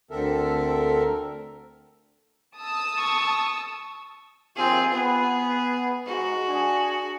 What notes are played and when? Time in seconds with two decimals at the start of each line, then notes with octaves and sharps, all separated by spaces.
0.11 D2 D3 C4 A4 A#4 E5
2.58 A5 D#6 E6
2.98 C#6
4.56 A#1 D#2 C4 F4 G#4
4.92 B3 G#4
6.06 G#2 F#4
6.46 D4 G#4